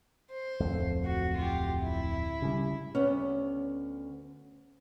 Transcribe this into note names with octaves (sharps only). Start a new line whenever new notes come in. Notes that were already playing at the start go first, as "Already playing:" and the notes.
C5
D1 F2 A3
F#4
F4 G4
E4
C#3 G3
D2 B3 C#4